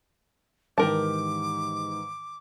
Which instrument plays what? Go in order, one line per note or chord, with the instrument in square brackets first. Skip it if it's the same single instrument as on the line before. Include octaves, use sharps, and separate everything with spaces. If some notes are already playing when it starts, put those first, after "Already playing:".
[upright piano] G#2 D#3 E3 [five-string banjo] G4 A#4 A5 [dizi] D6